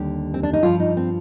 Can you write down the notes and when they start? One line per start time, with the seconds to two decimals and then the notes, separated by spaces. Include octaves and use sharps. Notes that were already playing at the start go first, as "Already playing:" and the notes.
Already playing: D#2 D3 G3 G4
0.34 C4
0.43 D4
0.53 D#4
0.62 G2 F3 F4
0.80 D#4
0.97 C4